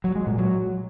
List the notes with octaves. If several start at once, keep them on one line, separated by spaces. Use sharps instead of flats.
F#3
G#3
A#2
F#3